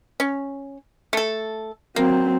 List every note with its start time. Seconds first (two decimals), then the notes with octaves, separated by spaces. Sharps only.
0.20 C#4
1.13 A3 A4
1.96 F#3 A#3 C4